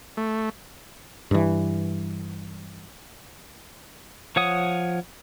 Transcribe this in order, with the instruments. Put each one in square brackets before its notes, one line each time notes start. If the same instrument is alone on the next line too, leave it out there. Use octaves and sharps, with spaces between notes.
[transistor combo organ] A3
[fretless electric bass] G2 E3
[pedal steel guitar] F3 C#5 F#5 D#6